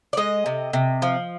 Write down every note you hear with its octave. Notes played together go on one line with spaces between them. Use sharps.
D5
G#3 D#5
C3
C3
F3